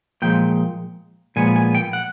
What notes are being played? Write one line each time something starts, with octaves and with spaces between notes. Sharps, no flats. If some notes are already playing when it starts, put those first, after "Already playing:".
A#2 F3 G#3 G5
A#2 F3 G#3 B3 G#5
G#5
G5
F#5